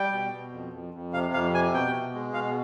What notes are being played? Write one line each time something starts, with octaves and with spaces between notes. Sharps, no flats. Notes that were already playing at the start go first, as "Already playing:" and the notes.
Already playing: G3 G5
B2
B2
F2
F2
F2
C3 F5
F2 F5
C3 G#5
B2 G5
B2
G#3
B2 F5